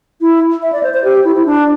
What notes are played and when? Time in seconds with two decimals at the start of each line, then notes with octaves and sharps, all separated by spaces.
0.21 E4
0.62 E5
0.73 D5
0.83 C5
0.94 C5
1.04 G4
1.24 E4
1.36 E4
1.46 D4